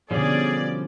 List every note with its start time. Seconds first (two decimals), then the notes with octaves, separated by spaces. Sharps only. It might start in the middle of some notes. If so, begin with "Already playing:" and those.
0.11 B2 D3 F3 G3 C#4 G#4 D5